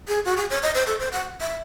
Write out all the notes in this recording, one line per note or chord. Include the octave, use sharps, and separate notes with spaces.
G#4
F#4
G#4
C#5
D#5
C5
A4
C5
F#5
E5